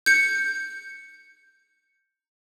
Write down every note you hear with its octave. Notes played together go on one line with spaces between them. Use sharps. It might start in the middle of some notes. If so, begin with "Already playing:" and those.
G6 C#7